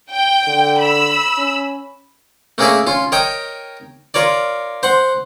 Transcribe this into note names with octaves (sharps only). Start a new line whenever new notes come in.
G5
D3
B5 E6
C#4
A3 A#3 C#4 G#4 A#4 E5
C#4 F4
A#4 C#5 D#5 G5
F4 A#4 C#5 D5
C5 F#5